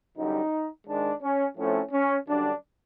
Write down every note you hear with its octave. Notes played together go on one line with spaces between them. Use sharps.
F#2 D3 G3 D#4
G#2 D#3 G#3 D4
C#4
A2 F3 A3 C4 C#4
C#4
F#2 D3 G3 D4